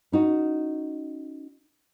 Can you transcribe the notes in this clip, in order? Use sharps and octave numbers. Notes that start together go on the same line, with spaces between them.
C#4 D#4 F#4